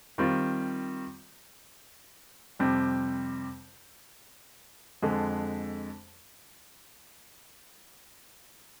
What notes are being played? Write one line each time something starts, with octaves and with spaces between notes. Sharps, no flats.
D#3 G3 C4 F4
F2 C3 G3 C4
F2 D3 G#3